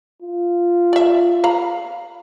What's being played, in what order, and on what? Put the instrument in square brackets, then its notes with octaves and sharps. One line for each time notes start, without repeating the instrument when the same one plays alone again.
[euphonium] F4
[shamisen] D5 E5
F5 A#5 B5